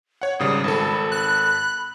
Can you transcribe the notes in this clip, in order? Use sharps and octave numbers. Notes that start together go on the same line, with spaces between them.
C#5 F#5
G#1 C#3 G3 D#6
G#1 A4 B5
B5
F#6